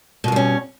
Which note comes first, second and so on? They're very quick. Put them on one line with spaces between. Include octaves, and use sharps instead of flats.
B2 G2 G3 C#4